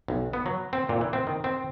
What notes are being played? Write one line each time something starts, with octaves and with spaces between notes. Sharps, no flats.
B1
B3
F#3
C4
A#2
E3
C4
D#3
C4